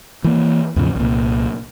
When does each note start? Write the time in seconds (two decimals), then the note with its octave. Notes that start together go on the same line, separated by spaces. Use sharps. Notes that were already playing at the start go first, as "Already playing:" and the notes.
0.24 E3 A#3
0.76 E2 A2 C#3 F3
0.96 C2 A#2